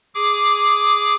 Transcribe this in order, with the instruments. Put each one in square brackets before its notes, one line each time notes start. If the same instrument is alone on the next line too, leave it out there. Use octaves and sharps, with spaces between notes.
[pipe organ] G#4 D6